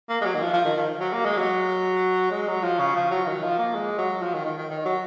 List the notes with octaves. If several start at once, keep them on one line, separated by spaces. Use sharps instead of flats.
A#3
G#3
F#3
D#3
F3
F3
D#3
D#3
F#3
A#3
G#3
F#3
G#3
F#3
F3
C#3
F3
F#3
D#3
F3
A#3
G#3
F#3
F3
D#3
D#3
D#3
D#3
F#3